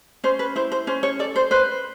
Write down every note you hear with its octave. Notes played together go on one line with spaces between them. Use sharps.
C#4 C5
B4
E4 C5
C5
C#4 C5
C#5
A4 D5
C5
B4 C5